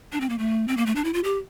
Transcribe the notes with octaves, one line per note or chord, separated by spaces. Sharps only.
D4
C4
A#3
A3
C4
A#3
A3
D4
E4
F4
G4